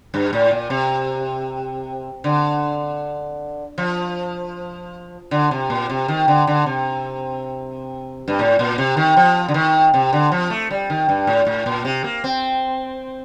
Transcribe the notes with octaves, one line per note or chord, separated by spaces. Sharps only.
G2
A2
A#2
C3
D3
F3
D3
C3
A#2
C3
D#3
D3
D3
C3
G2
A2
A#2
C3
D#3
F3
D3
D#3
C3
D3
F3
A3
G3
D#3
G2
A2
A2
A#2
C3
A#3
C4